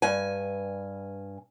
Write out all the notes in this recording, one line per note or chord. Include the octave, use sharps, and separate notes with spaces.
G2 G#5